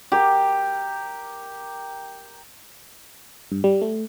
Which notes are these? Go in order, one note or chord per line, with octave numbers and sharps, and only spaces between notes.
G4 A#4
G2
G3
A3